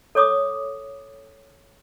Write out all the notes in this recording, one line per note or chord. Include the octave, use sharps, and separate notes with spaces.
A4 C#5 D6 D#6